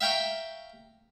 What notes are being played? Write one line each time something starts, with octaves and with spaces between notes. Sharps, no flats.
E5 F5 G5 A#5 C#6